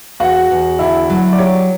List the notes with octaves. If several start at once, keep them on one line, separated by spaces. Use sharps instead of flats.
E2 F#4 F#5
E2
D3 E4 E5
F#3
D5
G4 C#5